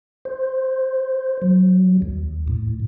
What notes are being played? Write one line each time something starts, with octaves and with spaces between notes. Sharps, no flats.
C5
F#3
D#2
A2